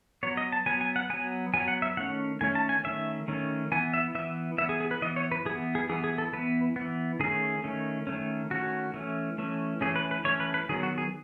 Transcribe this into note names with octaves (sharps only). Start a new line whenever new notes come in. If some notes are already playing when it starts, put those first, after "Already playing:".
F#3 B3 C#5
D#5
A5
F#3 B3 G#5
G#5
F#5
F#3 B3 G#5
F#3 B3 G#5
F#5
E5
D#3 A3 C#4 F#5
D#3 A3 C#4 G#5
A5
G#5
D#3 A3 C#4 E5
D#3 A3 C#4
E3 B3 G#5
E5
E3 B3 E5
E3 B3 E5
G#4
G#4
B4
E3 B3 D#5
C#5
B4
E3 B3 G#4
G#4
E3 B3 G#4
G#4
A4
E3 B3 B4
B3
E3
D#3 A3 C#4 G#4
D#3 A3 C#4
D#3 A3 C#4
D#3 A3 C#4 F#4
E3 A3 C#4
E3 A3 C#4
E3 A3 C#4 G#4
B4
B4
E3 A3 C#4 C#5
B4
B4
D#3 F#3 B3 G#4
F#4
G#4